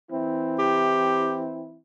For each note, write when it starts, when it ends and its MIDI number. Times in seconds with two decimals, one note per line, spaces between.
0.12 1.79 52
0.12 1.79 60
0.12 1.79 64
0.59 1.43 67